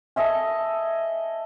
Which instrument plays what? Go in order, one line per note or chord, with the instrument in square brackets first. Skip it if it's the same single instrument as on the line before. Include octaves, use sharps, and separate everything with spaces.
[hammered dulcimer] A4 D#5 E5 G#5